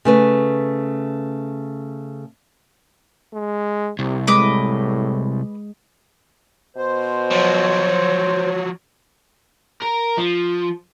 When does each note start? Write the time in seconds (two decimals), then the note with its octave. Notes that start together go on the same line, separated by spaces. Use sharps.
0.05 C#3 A3 B4
3.34 G#3
3.99 C2 C3
4.27 A2 G#3 B4 D#5 D6
6.77 B2 C5
7.31 F3 F#3 C#5
9.82 A#4
10.18 F3